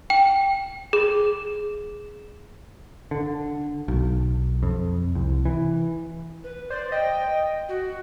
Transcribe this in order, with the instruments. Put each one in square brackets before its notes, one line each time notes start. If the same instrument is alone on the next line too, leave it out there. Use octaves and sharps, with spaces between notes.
[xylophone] G5
G#4
[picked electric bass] D3
B1
F2
C2
E3
[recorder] B4
[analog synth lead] C5 [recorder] D5
[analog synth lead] D#5 [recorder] G5
[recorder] F#4